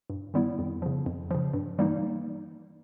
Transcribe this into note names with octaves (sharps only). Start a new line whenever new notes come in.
G2
D#3 G3 B3 E4
F2
C#3 F3
F2
C#3 F3
G2
E3 G3 A#3 D#4